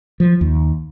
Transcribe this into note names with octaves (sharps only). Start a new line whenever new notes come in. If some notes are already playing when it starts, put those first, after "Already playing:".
F3
D#2